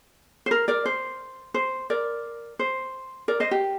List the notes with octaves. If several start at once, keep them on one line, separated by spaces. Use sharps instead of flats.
C5
A#4
A#4 D5
C5
C5
A#4 D5
C5
A#4 D5
C5 D#5
G4